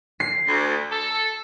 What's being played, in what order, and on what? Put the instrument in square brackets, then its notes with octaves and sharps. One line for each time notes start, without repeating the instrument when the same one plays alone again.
[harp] C7
[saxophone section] D2
A4